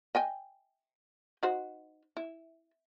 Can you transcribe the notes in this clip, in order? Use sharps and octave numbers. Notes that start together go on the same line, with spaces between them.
D#5 G5 G#5
D#4 F#4 C5
E4